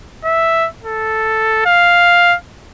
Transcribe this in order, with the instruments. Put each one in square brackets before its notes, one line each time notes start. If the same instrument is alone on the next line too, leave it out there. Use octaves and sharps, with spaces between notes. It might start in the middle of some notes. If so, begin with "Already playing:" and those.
[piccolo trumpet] E5
A4
F5